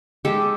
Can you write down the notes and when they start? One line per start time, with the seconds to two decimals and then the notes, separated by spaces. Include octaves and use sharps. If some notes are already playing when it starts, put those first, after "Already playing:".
0.25 G#3 G4 A4